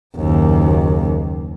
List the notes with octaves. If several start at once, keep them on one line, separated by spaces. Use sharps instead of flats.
F#1 D#2